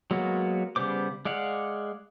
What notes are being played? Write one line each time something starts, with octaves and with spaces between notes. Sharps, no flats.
F#3 G#3 A#3 B3 F#4
C#3 G3 B3 C5 D6
G#3 D5 F5 F#5